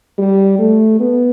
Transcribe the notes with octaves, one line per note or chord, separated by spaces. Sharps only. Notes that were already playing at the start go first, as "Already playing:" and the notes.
G3
A3
B3